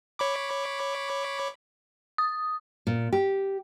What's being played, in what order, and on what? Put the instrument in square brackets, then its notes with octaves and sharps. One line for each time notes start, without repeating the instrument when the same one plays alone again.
[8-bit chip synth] C#5 B5 D6
[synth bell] D#6
[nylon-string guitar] A#2
G4